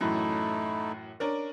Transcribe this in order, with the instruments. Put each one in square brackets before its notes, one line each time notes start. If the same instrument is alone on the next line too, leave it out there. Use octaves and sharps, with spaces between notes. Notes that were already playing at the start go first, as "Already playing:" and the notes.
[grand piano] F#2 A2 E3 [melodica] A3 D#4 E4
[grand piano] C#4 D4 A#4